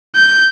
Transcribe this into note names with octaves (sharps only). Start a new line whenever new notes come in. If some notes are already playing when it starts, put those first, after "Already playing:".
G6